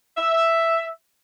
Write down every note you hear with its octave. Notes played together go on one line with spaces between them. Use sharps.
E5